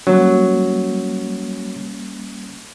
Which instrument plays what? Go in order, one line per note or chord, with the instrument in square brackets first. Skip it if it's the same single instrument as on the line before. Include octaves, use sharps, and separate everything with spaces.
[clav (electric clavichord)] F#3 [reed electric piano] G3 A#3 C#4